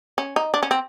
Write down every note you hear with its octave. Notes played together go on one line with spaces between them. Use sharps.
C#4
D#4
D4
C#4
C4